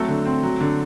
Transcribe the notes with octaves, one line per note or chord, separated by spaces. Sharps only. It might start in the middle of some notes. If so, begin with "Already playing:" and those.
Already playing: F#3 A3 C4 A4
D3
C4
F#3
D3